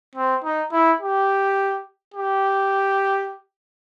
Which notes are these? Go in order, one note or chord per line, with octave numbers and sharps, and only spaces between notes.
C4
D#4
E4
G4
G4